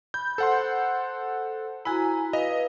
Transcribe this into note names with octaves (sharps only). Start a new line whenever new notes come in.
B5 G6
A4 C5 F#5 C6
E4 F#4 G#5 A#5 B5
B4 D#5 F5